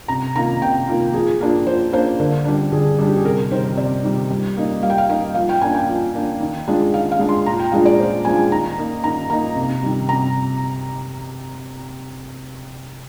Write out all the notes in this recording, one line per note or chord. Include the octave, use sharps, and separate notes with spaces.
C3 A#5
D#3 A#3 F4 A#5
C3 G5
D#3 A#3 F4
F3 G#4
A#3 D4 F4
F3 C5
A#3 D4 F4 C5
D3 A#4
G3 D4
D3 G#4
G3 D4
G4
G#4
C3 A#4
D#3 G3 C5
C3 D5
D#3 G3
G3
A#3 D#4
G3 F5
G5
F5
A#3 D#4 F5
F3 F5
G5
A#3 D4 G#5
G5
F3
A#3 D4
D#3
G#3 D4 F4
D#3 F5
F5
G#3 D4 F4
C6
A#2 A#5
G5
F3 G#3 D4 F4 F5
D5
A#2 C5
F3 G#3 D4 F4 G#5
D#3 A#5
A#3 D#4
D#3 A#5
A#3 D#4 A#5
C3
D#3 G3
C3 A#5